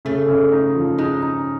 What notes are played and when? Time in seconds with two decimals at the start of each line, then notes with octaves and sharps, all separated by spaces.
0.05 C#3 A3
0.28 C#3
0.52 D#4
0.75 F3
0.98 G#3 D#4
1.22 D#4